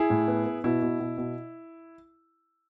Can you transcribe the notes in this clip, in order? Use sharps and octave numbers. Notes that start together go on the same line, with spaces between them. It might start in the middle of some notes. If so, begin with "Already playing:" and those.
Already playing: E4 G#4
A2
B3
B3
B2 E4
B2
B2
B2